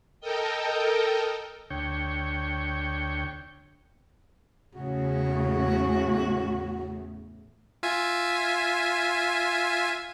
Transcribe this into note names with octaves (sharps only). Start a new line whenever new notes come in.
A4 A#4 D#5 G5
D2 C#5 G5
E2 A2 C#3 F#4
F4 E5 G#5